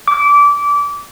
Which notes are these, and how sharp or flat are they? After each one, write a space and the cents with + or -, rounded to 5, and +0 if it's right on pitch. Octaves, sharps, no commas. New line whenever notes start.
D6 -25